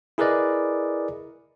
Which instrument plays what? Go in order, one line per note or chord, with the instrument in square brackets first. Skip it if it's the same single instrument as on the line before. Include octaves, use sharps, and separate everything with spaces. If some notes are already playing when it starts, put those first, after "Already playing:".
[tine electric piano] E4 G#4 A#4 B4 D5 D#5